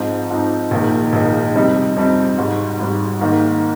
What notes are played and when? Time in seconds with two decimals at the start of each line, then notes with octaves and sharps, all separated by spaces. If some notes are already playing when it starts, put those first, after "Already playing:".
Already playing: G#2 F3 C4 D#4
0.30 G#2 F3 C4 D#4
0.71 A#1 G#2 D#3 A#3 D#4
1.13 A#1 G#2 D#3 A#3 D#4
1.55 F2 C3 G3 C4 D#4
1.96 F2 C3 G3 C4 D#4
2.38 G#1 G#2 G3
2.79 G#1 G#2 G3
3.21 G#2 D#3 A#3